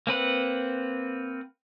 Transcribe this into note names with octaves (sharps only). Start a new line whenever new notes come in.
A#3 C4 B4 F#5